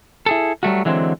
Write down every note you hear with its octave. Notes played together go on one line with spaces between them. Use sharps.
E4 G#4 A4
F#3 G3 A3 F#4
D3 E3 F#3 G#3 B3 C4